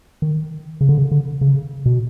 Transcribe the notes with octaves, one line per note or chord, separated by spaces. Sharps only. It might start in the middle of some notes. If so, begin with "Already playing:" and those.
D#3
C#3
D3
C#3
D3
C#3
B2